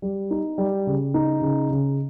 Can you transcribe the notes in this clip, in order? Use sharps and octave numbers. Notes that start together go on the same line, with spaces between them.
G3
D#4
G3
C#3
D#4
C#3
C#3